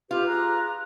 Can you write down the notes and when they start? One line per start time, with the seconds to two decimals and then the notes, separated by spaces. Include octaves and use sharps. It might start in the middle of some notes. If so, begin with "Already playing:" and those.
0.11 F4 G4 B4
0.26 G#4 A#5 F#6